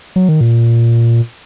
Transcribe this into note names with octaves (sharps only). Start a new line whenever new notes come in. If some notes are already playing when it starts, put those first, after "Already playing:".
F#3
D#3
A#2